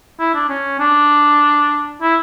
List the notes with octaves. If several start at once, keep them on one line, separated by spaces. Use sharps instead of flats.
E4
D4
C#4
D4
E4